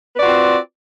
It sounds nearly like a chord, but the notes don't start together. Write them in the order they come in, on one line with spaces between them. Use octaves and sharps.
B4 D5 F#4 F4 C4